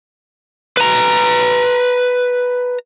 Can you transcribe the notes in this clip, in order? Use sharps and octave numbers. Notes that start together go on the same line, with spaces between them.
B4 A#5